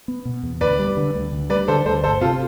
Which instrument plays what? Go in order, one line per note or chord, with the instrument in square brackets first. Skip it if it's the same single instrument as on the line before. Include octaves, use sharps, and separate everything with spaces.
[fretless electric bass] B3
B2
E2
[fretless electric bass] D2 [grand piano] B4 D5
[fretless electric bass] G3
D3
D2
D2
[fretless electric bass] G3 [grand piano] B4 D5
[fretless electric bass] D3 [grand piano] A4 C5
[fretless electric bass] D2 [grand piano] A4 C5
[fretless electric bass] G1 [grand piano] A4 C5
[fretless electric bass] C3 [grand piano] F4 A4